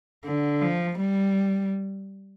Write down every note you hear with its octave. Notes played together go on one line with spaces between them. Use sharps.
D3
F3
G3